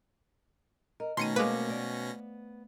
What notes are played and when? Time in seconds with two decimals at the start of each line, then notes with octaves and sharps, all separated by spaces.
1.00 A#4 D#5
1.17 B2 D#3 A3 C#4 C6 A#6 C#7 D#7
1.36 G#3 A#3 B4 C5 F5 D6
1.70 B3 D5